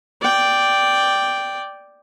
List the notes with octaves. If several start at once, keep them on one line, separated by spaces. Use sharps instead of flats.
D5 G5